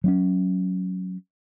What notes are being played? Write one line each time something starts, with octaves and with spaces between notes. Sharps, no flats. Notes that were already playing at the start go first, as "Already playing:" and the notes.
F#3 C4 C#4